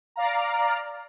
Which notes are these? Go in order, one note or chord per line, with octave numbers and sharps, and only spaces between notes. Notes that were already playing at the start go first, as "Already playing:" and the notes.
D5 F5 A#5